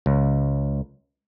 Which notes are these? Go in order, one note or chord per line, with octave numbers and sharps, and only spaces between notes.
C#2